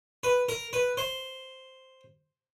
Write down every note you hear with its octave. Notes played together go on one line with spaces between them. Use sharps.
B4
A#4
B4
C5